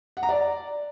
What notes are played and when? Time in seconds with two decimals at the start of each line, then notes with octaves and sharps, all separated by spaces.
0.17 F#5
0.23 A#5
0.29 D5